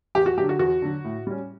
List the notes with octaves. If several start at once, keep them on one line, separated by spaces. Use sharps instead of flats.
E2 G4
F#4
D3 F#3 G4
F#4
E2 F#4
D3 F#3
A2
G3 C#4